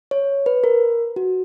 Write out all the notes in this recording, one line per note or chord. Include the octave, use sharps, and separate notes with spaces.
C#5
B4
A#4
F#4